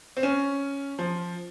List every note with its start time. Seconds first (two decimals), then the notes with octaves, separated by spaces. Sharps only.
0.17 C4
0.23 C#4
0.99 F3